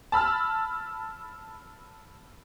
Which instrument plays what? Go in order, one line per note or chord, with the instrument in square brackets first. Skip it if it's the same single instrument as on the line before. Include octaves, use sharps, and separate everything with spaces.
[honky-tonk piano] A5 B5 E6 F6